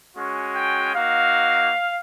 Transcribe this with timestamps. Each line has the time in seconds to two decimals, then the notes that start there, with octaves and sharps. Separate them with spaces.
0.17 G#3 C#4 F#4
0.55 G5
0.94 A#3 D#4 F#4 F5